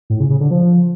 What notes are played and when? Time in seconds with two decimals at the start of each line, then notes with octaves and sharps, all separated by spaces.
0.10 A2
0.20 C#3
0.30 C#3
0.40 D3
0.51 F3